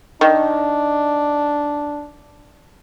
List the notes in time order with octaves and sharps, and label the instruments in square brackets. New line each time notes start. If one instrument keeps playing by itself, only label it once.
[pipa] D#3 [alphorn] D4